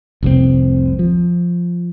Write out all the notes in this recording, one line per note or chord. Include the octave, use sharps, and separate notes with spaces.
F1 C2 A#2 C4
F3